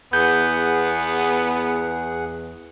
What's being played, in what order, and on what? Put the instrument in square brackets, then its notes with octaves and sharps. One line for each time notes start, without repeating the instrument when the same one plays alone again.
[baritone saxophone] E2 [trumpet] B3 [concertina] G#4 F#5 [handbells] G6